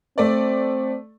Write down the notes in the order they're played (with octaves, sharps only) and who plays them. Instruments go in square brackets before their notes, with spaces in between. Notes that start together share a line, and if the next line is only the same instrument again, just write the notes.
[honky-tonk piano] A3 D5 [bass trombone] C4